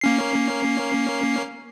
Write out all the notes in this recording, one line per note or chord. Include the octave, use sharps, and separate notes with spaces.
A#3 C#4 C7